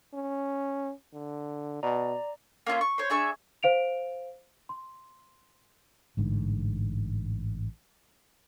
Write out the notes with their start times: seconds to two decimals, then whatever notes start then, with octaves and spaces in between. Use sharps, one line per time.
0.13 C#4
1.13 D3
1.83 B2 D5 A#5
2.67 A#3 C#4 F4 E5
2.81 C#6
2.98 C5 C#5
3.10 D4 G#4 E5 C#6
3.63 C5 F5 D7 F7
4.69 C6
6.17 A1 G#2 D3